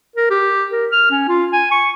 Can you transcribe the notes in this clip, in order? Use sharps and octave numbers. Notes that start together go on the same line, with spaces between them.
A#4
G4
A#4
F6
C#4
F4
G#5
C#6